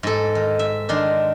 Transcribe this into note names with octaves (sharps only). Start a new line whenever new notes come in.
G#2 A4
D#3
E5
D#3 D4 C6